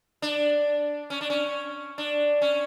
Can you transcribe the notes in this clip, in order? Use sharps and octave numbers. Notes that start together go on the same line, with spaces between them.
D4
C#4
D4
C#4
D4
C#4